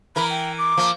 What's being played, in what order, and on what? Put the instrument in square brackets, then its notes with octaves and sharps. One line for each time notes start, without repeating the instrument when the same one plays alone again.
[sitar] E3 A#4 [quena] B5
[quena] G5
D6
[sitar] F3 A#3